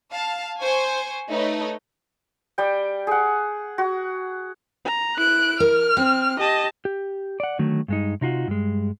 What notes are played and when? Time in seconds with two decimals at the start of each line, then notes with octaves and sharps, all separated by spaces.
0.13 F5 A5
0.60 C5 G#5 C#6
1.30 A3 D#4 B4 C#5 D#5
2.58 G3 G5
3.07 G#4 F#5
3.78 F#4
4.85 A#5
5.17 E4 F#6 D7
5.60 A#4 F6
5.97 C4 G5
6.40 G4 D#5 A5
6.85 G4
7.40 D5 F#5
7.59 D3 D#3 F#3 A3
7.88 G2 G#3 D#4
8.21 C3 D#4 F4 F#4
8.48 G2 G#3